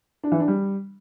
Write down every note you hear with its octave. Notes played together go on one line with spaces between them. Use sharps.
D4
E3
D4
G3